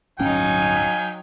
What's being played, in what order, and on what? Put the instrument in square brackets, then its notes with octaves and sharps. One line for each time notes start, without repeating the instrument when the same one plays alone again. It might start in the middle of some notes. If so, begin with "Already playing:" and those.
[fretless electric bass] D1 G1 C#4 [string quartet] F#3 D#4 [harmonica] F5 G5 [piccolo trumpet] G#5